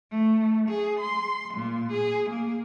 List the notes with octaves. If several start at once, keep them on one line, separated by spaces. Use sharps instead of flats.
A3
G#4
C6
A#2
G#4
A#3